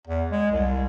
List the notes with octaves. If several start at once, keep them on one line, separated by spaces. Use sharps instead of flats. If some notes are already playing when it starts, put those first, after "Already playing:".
E2
G#3
C2